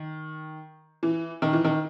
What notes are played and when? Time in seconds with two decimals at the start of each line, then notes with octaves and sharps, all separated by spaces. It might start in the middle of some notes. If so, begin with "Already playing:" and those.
Already playing: D#3
1.03 E3
1.42 D#3
1.53 E3
1.65 D#3